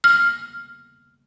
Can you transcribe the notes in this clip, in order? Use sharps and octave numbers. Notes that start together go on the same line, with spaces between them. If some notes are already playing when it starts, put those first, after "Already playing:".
F6